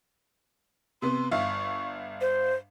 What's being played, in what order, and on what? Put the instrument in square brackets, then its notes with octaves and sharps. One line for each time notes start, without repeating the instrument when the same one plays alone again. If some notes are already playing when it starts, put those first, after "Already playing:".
[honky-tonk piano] C3 B3 [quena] C6
[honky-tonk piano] G1 E5 F5 [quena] C#6
[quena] C5